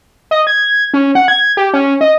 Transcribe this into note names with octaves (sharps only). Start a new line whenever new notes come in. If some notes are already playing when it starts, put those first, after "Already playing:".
D#5
G#6
C#4
F#5
G#6
G4
C#4
D#5